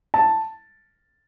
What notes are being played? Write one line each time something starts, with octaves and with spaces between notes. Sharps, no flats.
A5